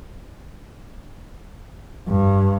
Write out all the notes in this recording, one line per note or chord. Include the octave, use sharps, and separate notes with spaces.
G2